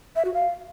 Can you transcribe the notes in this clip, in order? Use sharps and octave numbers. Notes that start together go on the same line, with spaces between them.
E5
F#4
F5